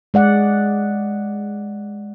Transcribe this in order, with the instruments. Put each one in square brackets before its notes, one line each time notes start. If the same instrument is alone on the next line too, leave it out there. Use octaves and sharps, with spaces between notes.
[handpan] G#3 D5 F#5